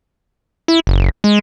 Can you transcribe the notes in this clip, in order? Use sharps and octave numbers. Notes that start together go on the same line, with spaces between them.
E4
F#1
G#3